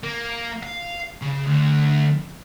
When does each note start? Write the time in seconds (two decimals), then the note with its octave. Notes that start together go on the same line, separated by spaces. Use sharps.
0.03 A#3
0.63 F5
1.22 C#3
1.47 D2